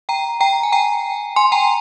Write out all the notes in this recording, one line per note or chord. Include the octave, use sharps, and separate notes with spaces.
G5 A#5
G5 A#5
G#5
G5 A#5
G#5 C6
G5 A#5